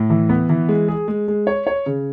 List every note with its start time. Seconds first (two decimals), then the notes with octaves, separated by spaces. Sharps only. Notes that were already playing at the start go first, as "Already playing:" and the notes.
Already playing: A2
0.10 E3
0.29 B3
0.49 E3
0.69 G#3
0.88 G#4
1.08 G#3
1.28 G#3
1.47 C#5
1.67 C#5
1.86 C#3